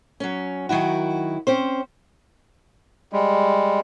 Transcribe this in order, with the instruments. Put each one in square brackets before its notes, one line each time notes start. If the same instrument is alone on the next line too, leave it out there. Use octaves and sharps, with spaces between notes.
[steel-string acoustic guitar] F#3 C#4
D#3 F#3 E4 F#4
C4 C#4 C5
[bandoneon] G3 G#3